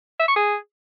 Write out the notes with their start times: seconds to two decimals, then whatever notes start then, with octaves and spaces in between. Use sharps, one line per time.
0.20 E5
0.28 C#6
0.36 G#4